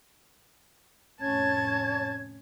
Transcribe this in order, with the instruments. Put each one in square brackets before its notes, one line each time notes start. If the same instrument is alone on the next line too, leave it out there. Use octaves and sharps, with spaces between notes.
[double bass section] F1 A2 C#4 [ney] C#5 [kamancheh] A5 [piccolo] G#6